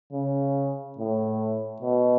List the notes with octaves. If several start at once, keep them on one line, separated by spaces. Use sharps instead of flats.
C#3
A2
B2